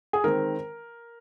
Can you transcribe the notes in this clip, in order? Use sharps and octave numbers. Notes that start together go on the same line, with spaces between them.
G#4
D#3 G#3 C4 A#4